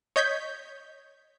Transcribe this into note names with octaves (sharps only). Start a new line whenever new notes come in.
C#5 D#5 G6 G#6 B6